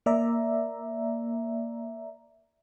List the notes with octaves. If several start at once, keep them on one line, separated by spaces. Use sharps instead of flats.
A#3 D5 E5 A#5